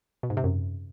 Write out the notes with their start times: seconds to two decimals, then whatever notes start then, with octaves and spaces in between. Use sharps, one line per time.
0.23 B2
0.30 G#2
0.37 C3
0.44 F#2